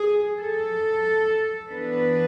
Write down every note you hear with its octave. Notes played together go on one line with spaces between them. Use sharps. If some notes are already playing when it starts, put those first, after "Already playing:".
Already playing: G#4
A4
E3 B3 D4 B4